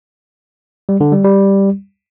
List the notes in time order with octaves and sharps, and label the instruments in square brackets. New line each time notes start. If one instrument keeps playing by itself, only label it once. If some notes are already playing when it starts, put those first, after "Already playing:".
[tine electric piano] G3
D3
G3
G3